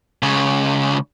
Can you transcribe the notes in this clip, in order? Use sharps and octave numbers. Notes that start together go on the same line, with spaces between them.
C#2 C#3